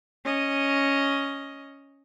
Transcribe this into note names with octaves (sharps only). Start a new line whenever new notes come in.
C#4 D#5